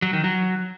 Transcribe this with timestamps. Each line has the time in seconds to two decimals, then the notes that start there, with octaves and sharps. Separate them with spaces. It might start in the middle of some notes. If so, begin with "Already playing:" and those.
0.02 F#3
0.13 D#3
0.24 F#3